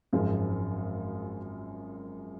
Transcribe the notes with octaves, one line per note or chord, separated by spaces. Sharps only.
G#1 F#2 F3 G#3